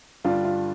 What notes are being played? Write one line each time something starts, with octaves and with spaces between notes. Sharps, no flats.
G2 D3 G3 D4 F4
F4